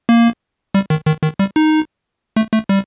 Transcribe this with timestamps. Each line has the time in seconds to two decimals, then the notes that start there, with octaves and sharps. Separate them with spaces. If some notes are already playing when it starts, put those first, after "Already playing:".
0.09 A#3
0.75 G3
0.90 D#3
1.07 D#3
1.23 D#3
1.39 G3
1.56 D#4
2.36 A3
2.53 A3
2.69 G3